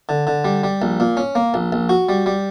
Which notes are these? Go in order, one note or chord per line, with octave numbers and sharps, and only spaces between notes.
D3
D3
G3
G3
A#1
A#2
C#4
A#3
A#1
A#1
F#4
G3
G3